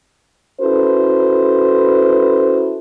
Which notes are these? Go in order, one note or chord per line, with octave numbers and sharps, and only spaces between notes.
C#4 E4 F#4 A4 B4 C5